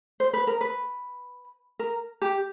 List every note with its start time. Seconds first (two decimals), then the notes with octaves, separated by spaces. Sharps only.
0.20 C5
0.33 B4
0.47 A#4
0.61 B4
1.79 A#4
2.22 G4